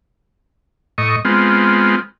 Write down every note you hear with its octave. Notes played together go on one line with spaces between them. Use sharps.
A2 D#5 C#6
G#3 B3 C4 F4